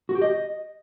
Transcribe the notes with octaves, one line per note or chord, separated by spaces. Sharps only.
F#4
G4
D#5